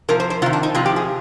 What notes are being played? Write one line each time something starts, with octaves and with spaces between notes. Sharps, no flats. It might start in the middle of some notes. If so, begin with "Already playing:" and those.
C3 F3 A#4
C5
C5
C3 D#3 F4
D4
D#4
C3 F3 F4
G4
G#4